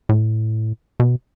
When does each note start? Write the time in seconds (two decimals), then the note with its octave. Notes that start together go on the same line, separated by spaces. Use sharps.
0.09 A2
1.00 B2